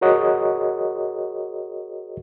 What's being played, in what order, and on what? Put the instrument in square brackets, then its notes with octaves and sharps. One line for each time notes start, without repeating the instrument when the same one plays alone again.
[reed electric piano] F#4 G#4 A#4 C#5 D#5 F#5